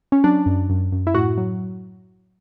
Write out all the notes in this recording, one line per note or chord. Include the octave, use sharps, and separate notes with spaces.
C#4
F#3 D4
F#2
F#2
F#2
E4
A2 F#4
F#3